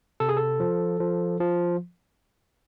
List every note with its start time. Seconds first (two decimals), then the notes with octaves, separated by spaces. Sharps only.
0.20 C3 A4
0.29 G#4
0.37 A4
0.60 F3
1.00 F3
1.40 F3